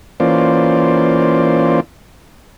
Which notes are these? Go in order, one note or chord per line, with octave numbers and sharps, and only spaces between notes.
E3 A#3 C#4 F4 C5 D5